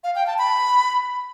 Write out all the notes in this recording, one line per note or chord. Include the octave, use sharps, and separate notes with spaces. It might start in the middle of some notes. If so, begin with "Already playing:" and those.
F5
G5
A5
B5